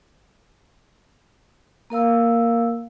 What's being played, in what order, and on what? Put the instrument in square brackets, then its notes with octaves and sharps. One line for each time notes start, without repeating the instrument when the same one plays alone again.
[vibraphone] A#3 A#4 F5 E6